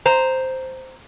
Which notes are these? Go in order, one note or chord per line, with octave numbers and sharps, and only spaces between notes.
C5 A#5